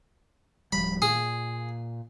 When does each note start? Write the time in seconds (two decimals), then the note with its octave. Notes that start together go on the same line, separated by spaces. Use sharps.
0.72 D1 F3 G3 B5
1.02 A#2 G#4